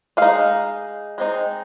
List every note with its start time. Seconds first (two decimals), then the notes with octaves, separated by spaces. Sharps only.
0.17 G#3 D#4 F5
1.18 G#3 C4 D#4